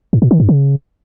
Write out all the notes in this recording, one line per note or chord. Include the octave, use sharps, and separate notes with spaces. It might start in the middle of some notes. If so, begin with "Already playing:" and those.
G#2
A#2
D#3
G2
C#3